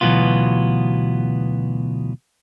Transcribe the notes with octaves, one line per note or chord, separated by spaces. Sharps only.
D2 B2 E3 F#3 B3 F4